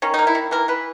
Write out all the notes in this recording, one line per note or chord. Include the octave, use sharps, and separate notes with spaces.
D#3 C#4
A#3 D#4
E4
D#3
E3 A#4
E3 B4